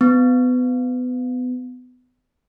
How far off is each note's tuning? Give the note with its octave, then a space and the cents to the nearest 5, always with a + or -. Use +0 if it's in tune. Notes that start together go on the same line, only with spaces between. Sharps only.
B3 +25